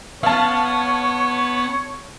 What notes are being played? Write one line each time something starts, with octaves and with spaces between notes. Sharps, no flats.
B3 C#5 F5 A5